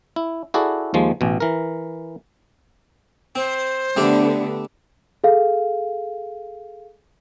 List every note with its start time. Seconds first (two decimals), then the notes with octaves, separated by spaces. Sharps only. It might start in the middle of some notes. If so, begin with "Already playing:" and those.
0.16 E4
0.54 E4 F#4 G#4 A4 D5
0.94 D#2 F3 G#3
1.21 A1 B2
1.40 E3 A#4
3.35 C4 C5
3.97 D3 G3 A3 B3 D4
5.24 G#4 A4 F5